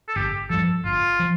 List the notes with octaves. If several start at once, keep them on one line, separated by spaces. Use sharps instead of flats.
A4
G1 G4
G2 F3 A4
G1 F4
F3